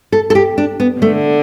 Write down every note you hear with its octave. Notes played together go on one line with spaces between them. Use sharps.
A4
A4
G4
D4
B3
D3 A3